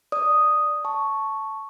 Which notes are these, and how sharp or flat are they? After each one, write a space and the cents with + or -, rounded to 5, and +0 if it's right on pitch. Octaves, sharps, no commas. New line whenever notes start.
D5 +0 D#6 +0
A5 +0 C#6 +0